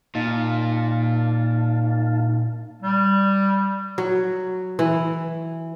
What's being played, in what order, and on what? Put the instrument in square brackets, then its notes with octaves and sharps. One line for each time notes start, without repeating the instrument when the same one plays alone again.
[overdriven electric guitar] A#2 [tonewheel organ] D#4 F5 A5
[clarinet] G3
[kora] F#3
E3